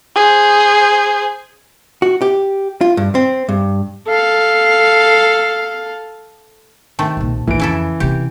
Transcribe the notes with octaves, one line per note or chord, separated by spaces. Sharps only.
G#4 C5
F#4
G4
F4
G2
C4
G2
A4 F5
C3 D#3 A3 A5
B1 A#2
B1 F2 E3 D7
F2 C#3 E4 A4
C3 C4 G4